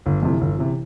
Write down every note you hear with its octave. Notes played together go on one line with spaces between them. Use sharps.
G1
F2 C3 E3
G1
C3 E3